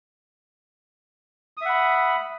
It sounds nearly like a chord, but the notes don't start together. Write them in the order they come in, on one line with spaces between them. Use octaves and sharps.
D#6 E5 F#5 B5